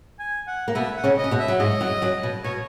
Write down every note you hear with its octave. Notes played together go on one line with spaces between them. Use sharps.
G#5
F#5
A#3
B2 B3 E5
F#5
C#3 C#4
D#5
C#4
B2 B3
E5
F#3
G#2 G#3 D#5
F#2 F#3
F#2 F#3
B2
B2 C#5